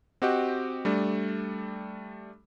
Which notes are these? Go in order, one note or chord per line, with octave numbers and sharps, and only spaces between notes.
C4 F#4 G4 D#5 F#5 G5
G3 A3 D4